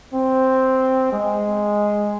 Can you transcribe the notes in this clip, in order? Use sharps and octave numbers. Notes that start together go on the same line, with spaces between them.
C4
G#3